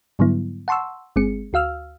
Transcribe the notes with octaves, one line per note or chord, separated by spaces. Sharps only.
G#2 D3 F#3 G3 B3 E4
F#5 A5 C6 C#6 E6
G1 G#3 C4 G#4 C#7
D2 F#4 F5 E6 F6